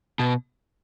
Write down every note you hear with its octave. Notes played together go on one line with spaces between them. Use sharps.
B2